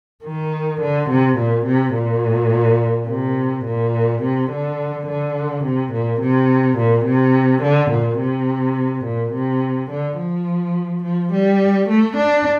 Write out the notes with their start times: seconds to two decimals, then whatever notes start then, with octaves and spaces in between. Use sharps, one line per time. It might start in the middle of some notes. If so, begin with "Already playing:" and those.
0.24 D#3
0.81 D3
1.10 C3
1.38 A#2
1.66 C3
1.95 A#2
3.08 C3
3.65 A#2
4.22 C3
4.51 D3
5.07 D3
5.64 C3
5.93 A#2
6.21 C3
6.77 A#2
7.06 C3
7.62 D3
7.91 A#2
8.20 C3
9.05 A#2
9.33 C3
9.91 D3
10.18 F3
11.03 F3
11.33 G3
11.89 A3
12.17 D4